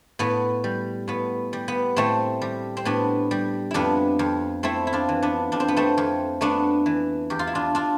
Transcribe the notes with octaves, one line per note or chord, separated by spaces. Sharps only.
A2 B3
G3
A2 B3
G3
B3
A2 A3 C4
G3
C4
A2 B3 D4
G3
F2 B3 D4 E4
F2
A3 C4 E4
E4
D4 F4
E3
B3 D4
F2 D4
C4
B3
A3 C4
F2
A3 B3 D4
E3
E2 G4
F4
E4
D4 F4
D4 F4